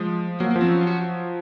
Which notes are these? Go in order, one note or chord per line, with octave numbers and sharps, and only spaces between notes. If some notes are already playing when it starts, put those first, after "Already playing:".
Already playing: F3 G#3
F#3 A#3
A#3
F3
C4
C#4
F4
F#4